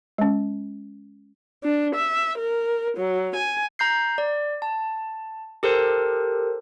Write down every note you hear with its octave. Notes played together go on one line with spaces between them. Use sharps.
G#3 C#4
D4
E5
A#4
F#3
G#5
A#5 G6 C7
D5
A5
G4 A4 A#4 C5